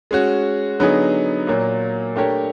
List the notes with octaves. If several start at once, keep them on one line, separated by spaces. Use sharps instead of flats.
G#3 C#4 F#4
D3 F#3 B3 D#4 G#4
A#2 F#3 A#3
A3 D4 G4 A#4 C#5